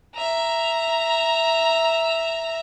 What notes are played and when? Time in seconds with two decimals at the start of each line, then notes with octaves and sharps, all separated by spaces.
0.15 E5 A#5